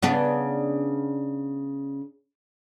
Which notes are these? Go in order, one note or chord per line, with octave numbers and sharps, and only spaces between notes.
C#3 B3 D4